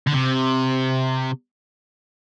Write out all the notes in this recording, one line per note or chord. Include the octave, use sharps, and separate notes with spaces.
D3
C3